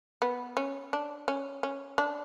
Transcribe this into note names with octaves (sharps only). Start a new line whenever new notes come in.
B3
C#4
D4
C#4
C#4
D4